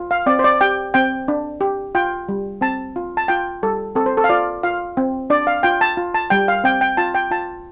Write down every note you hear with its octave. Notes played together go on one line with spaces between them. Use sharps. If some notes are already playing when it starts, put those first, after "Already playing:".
Already playing: F4
F5
C4 D5
C5
D5
G4 G5
C4 G5
D4
G4
F4 G5
G3
C4 A5
F4
A5
F4 G5
G3 A4
C4 A4
C5
A4
F5
F4 D5
F4 F5
C4
D4 D5
F5
F4 G5
A5
F4
A5
G3 G5
F5
C4 G5
G5
F4 A5
G5
F4 A5